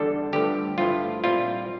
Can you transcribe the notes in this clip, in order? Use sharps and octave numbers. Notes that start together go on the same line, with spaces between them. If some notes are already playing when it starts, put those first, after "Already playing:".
Already playing: E2 D3 G3 D4 A4
G1 G2 D3 F3 A3 G4
G2 F3 A3 E4 F4
A#2 G3 C4 E4 F4